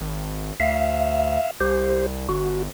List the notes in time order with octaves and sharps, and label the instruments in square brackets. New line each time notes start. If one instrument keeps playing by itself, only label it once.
[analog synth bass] G#1
[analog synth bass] D2 [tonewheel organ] E5 F5
[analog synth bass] C2 [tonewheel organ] G4 C5
[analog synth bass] G1 [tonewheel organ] F#4